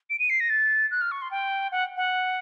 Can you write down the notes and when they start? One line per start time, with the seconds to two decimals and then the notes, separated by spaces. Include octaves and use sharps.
0.10 D7
0.19 D#7
0.30 C7
0.40 A#6
0.50 A6
0.91 F#6
1.01 F6
1.12 C#6
1.22 C6
1.31 G5
1.72 F#5
1.97 F#5